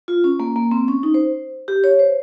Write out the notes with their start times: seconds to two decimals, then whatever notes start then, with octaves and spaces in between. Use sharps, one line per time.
0.08 F4
0.24 C#4
0.40 A#3
0.56 A#3
0.71 C4
0.88 C#4
1.03 D#4
1.14 C5
1.68 G4
1.84 C#5
1.99 C5